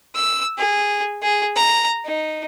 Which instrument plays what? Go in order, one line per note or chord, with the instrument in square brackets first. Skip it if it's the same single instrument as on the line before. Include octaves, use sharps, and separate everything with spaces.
[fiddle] E6
G#4
G#4
A#5
D#4